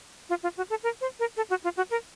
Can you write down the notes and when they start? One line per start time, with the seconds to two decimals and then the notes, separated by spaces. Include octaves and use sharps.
0.29 F4
0.43 F4
0.57 F#4
0.70 A4
0.83 A#4
1.01 C5
1.20 A#4
1.37 A4
1.50 F#4
1.64 F4
1.77 F#4
1.91 A#4